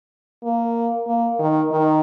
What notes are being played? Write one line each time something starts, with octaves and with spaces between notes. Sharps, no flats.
A#3
A#3
D#3
D#3